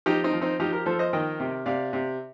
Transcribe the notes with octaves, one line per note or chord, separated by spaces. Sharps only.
F3 D#4 G4
C4 D#4
F3
C4 D#4
F3 D#4 G4
G4 A#4
F3 A4 C5
C5 D#5
D#3 D#5 G5
C3
C3 D5 F5
C3